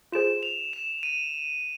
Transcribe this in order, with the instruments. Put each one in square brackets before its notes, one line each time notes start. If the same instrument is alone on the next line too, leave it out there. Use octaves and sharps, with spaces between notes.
[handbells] F4 G#4 C5 [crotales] E7
[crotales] F7
E7
D#7